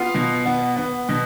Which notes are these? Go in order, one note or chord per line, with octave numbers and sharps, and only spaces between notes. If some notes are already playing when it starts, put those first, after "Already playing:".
Already playing: B3 F4 F5
B2
B3
B3
B2